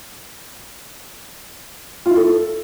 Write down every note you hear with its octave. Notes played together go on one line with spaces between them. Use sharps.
F4
E4
A4